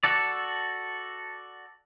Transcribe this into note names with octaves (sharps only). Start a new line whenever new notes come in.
F#4 A4 D5